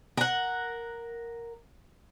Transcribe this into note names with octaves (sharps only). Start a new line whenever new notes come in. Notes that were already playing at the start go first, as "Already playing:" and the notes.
A#4 F#5